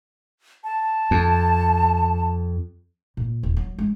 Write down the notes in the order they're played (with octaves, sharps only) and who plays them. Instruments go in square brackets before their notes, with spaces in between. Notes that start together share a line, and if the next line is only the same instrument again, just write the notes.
[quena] A5
[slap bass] F2
[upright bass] A#2
D#1
F#3
G#3